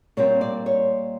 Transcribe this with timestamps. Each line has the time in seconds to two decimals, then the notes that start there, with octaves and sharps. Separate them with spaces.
0.17 A#2 G3 C4 C#5
0.41 D5
0.66 C#5